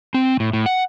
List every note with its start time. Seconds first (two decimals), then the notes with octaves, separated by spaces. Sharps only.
0.14 C4
0.40 A2
0.53 A2
0.66 F#5